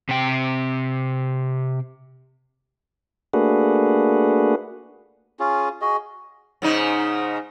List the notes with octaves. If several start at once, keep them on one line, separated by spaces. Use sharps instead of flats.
C3 G5
A3 A#3 D4 F#4 G#4 B4
C#4 F4 G#4
F#4 G#4 D#5
G#2 C#3 D#4